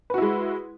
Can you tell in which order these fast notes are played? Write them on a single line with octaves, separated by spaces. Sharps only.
B4 F#4 E4 G#3